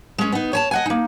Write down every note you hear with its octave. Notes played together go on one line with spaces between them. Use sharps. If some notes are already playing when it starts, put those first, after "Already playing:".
G#3 C#4
B3 D#4
C#5 G#5 A5
D#5 F#5 G#5
A#3 D#4